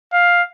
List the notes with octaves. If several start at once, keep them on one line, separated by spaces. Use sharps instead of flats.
F5